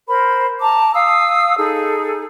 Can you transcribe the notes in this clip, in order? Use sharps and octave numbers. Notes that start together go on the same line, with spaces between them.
A#4 C5 B5
A5 A#5 D6
F5 D#6 E6
D#4 G#4 A4